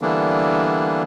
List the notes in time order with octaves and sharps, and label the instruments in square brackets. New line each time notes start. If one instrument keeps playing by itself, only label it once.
[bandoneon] D3 E3 G3 A#3 B3 D4